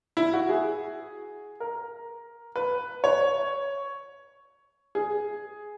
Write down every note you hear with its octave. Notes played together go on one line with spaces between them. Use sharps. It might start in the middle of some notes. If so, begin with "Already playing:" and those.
E4
F#4
G#4
A#4
B4
C#5
G#4